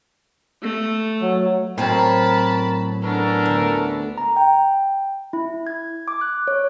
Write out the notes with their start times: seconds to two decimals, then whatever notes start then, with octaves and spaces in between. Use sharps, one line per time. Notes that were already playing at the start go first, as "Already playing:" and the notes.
0.62 A3
1.22 F#3
1.78 A2 F#3 C4 C#4 A#4 A5 B5
3.02 B3 C#4 D4 A4 A#4
3.46 D2
4.18 A#5
4.36 G5
5.33 E4
5.67 G#6
6.08 D6
6.21 F#6
6.48 C#5